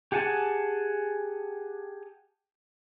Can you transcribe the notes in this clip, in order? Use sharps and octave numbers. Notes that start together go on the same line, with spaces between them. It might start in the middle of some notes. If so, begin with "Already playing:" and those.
G4 G#4 F#5 G#5 A5